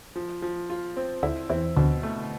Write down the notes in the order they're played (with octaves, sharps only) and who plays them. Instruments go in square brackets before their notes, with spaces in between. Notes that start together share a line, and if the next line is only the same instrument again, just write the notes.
[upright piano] F3
F3
F4
C4
[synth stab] D2 D3 [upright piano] E4
[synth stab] E2 E3 [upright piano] C4
[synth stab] D2 D3 [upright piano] B2
[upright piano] A3